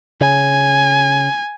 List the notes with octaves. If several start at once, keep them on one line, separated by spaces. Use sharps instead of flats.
C#3 G#5